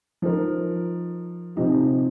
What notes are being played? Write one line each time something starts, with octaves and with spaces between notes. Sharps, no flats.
F3 D#4 A#4
C3 F3 C4 D#4 G4